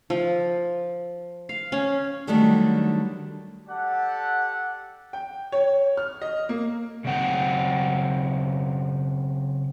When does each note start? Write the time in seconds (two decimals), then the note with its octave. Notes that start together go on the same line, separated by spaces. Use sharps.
0.10 F3
1.49 F5
1.72 C#4
2.27 D3 D#3 F#3 G3 A3 D4
3.68 G4 A4 D5 F#5
5.13 G5
5.52 C#5
5.97 F6
6.22 D#5
6.49 A#3
7.05 C#3 F#3 C4 F#5 G5